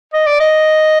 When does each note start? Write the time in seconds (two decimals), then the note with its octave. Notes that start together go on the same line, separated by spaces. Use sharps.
0.14 D#5
0.26 D5
0.40 D#5